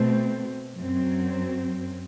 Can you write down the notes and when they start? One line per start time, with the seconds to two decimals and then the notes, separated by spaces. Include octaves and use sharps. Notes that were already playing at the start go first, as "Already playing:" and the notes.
Already playing: B2 A3 C4
0.74 F#2 F#3 C4